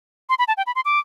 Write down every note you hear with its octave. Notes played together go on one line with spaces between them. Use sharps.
C6
B5
A5
G5
B5
C6
D6